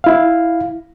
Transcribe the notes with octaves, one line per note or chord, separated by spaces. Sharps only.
E4 F5